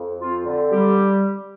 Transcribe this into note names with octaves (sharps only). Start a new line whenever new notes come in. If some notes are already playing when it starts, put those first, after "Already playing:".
Already playing: F2
C4 F4
D3
G3 G4